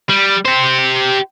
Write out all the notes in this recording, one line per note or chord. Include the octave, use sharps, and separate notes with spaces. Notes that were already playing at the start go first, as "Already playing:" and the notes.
G3
G4 C5